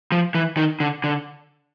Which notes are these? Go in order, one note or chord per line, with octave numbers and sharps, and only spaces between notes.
F3
E3
D#3
D3
D3